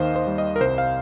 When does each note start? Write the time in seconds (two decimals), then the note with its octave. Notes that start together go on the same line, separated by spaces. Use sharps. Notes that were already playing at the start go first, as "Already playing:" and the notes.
Already playing: D#2 D#3 C5 D#5 F5
0.16 C5
0.27 G3
0.38 D#5
0.56 A#4
0.61 C2 C5
0.78 F5